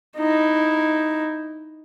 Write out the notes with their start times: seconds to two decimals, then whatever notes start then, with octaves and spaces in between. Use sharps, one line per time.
0.17 D#4 E4